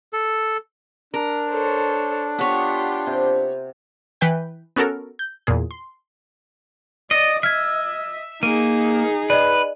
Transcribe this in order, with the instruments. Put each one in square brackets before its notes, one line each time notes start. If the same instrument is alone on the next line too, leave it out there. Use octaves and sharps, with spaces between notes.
[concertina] A4
[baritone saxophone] D4 [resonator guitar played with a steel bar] A#4
[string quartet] A4 C5 C#5
[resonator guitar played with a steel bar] B3 C#5 [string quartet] F4 G4 [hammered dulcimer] F#5
[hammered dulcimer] C3
[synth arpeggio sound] E3 B4 G5 G6
B3 C#4 F#4 A4 A#4
G6
E2 A#2 G#4
C6
[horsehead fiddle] D5 [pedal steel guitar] D#5
[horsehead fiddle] D#5 [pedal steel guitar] E5 [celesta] F6 G#6
[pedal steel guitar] A#3 [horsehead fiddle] D#4 G#4 [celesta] D#7
[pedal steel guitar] B4 [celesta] D5 D#5